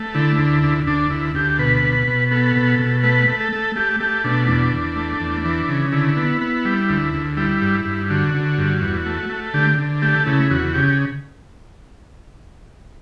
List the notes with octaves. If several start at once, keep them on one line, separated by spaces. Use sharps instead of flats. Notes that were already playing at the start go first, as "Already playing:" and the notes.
Already playing: A3
D3 E4
D2
D2
D2 D4
D2 E4
D2 G4
B2 B4
B2
B2
B3 A4
B2
B2
A3 B4
A3
A4
A3
A3 G4
A3 G4
B2 D4
E2 D4
E2
A3
E2
E3
C#3
D3 E4
B3
B3
G3
D2
D2
G3 E4
G2
G2
D3 F#4
D3
G2
E2
A3
A3
D3 G4
D3
A3 G4
C#3 E4
E2 F#4
C#3 G4